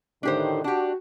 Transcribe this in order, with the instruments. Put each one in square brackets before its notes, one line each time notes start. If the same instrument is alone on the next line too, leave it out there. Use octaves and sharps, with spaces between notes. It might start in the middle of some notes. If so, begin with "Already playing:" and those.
[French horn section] A2 D3 D#3 [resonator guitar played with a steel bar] D4 G4 C5
[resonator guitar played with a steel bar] D4 G4 [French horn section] F#4